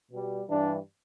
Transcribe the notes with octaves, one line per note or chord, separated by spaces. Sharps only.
B2 G3
G2 E3 G3 D4